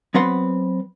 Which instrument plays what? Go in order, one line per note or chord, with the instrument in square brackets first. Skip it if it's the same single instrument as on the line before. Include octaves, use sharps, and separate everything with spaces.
[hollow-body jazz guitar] F#3 B3 C4 B4 F#5 C6